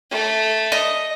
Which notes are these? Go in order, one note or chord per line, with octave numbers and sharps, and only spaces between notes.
A3
D#5